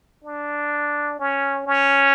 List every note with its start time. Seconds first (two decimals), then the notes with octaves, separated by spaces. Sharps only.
0.24 D4
1.20 C#4
1.66 C#4